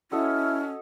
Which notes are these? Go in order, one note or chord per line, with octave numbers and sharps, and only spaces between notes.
C#4 E4 F#4 A4 D#5